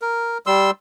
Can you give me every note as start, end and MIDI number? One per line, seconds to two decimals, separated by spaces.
0.02 0.38 70
0.46 0.71 55
0.46 0.71 84
0.46 0.71 88